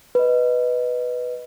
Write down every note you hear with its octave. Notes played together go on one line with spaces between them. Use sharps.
B4 D#5